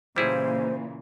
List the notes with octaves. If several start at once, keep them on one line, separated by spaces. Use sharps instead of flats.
A#2 C#3 E3 G3 E4 G#4 C5